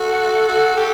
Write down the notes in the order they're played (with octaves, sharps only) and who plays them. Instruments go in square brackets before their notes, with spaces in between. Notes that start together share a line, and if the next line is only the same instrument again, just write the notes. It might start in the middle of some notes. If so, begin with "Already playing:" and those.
Already playing: [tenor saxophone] F#4 [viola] A4
[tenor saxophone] F#4
G4